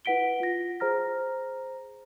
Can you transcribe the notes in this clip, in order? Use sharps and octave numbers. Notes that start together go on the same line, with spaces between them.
E4 B4 F#5 B6 D7 G7
F4 A#6
G#4 C5 A#5 F6 A#6